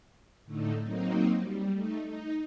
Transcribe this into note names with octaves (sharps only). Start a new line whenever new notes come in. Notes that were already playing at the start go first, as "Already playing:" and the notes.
A2 D3 A3 D#4
F#3 A#3 C4 D#4
G3
A3 D#4
D#4